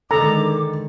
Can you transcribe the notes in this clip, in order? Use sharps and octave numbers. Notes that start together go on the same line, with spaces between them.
D3 D#3 G#3 A4 A#5 D6